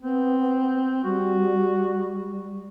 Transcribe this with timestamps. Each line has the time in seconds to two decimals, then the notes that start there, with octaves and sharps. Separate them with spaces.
0.02 B3 C4
1.04 G3 F#4